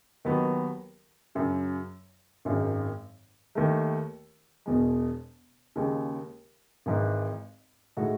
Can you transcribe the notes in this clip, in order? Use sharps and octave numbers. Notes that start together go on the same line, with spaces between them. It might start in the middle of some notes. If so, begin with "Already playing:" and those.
D#2 D#3 F#3 B3 F#4
F#2 C#3 F#3
G#1 F#2 D#3 G#3
D#2 D#3 A3
E1 E2 B2 G#3
D#2 C#3 G#3
G#1 G#2 E3
A2 G#3 D#4 F#4